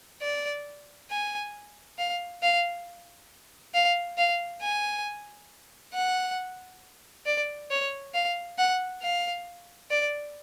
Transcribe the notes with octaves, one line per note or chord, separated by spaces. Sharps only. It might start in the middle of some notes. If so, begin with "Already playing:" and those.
D5
G#5
F5
F5
F5
F5
G#5
F#5
D5
C#5
F5
F#5
F5
D5